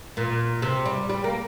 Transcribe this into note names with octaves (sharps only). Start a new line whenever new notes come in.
A#2
C3
G3
G3
A#3